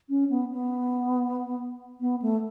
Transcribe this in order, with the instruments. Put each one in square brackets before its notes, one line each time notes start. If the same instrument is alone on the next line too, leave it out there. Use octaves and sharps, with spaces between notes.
[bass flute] C#4
B3
B3
B3
A3